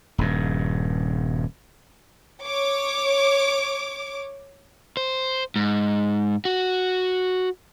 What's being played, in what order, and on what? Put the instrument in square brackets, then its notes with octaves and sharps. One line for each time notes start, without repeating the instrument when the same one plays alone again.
[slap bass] D#1 G2
[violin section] C#5 D6
[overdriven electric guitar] C5
G#2
F#4